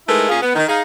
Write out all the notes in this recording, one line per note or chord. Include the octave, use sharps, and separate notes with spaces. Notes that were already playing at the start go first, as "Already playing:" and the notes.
G#3 A3 D#4 E4 A#4 B4
A#2 C#4 F4 G#4
B3
D#3
D#4 G#4 F5